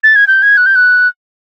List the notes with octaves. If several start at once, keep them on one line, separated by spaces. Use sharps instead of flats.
A6
G#6
G6
G#6
F#6
G6
F#6